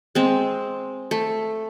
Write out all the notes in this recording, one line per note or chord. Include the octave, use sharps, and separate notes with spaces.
G#3 C4
A3